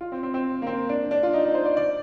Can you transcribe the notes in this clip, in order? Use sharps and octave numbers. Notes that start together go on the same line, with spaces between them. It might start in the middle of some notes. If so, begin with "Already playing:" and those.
F4
C4
C4
C4
A#3
C4
D4
D4
F4
D#4
D#4
C5
D5
D5